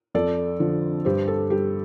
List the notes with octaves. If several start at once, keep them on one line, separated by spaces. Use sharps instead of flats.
F2 A4 D5
D3 F3
G2 G4 C5
A4
G3 G4